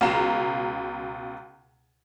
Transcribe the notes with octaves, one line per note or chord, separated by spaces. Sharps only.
C#2 B2 F5 A#5 E7